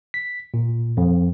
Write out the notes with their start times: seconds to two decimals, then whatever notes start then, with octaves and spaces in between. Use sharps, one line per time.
0.14 B6
0.54 A#2
0.97 F2